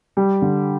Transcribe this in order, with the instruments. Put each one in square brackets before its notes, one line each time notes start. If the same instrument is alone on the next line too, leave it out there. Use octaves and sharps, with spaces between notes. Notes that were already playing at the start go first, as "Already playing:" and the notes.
[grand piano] G3
D3